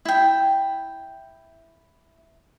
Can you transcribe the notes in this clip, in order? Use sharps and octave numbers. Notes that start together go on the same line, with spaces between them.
E4 G5